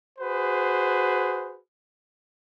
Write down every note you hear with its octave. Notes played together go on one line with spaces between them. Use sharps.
F#4 G#4 B4 C5